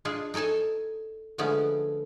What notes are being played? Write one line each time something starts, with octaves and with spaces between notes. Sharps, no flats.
G#3 D4 F4 G#4
D#4 A4 C#5 G#5 A5
D3 F3 G#3 A3 B3 C#4